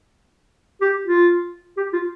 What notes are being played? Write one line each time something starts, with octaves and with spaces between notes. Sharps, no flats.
G4
F4
G4
F4